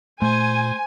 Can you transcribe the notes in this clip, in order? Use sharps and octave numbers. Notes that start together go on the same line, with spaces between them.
A#2 A3 C5 G#5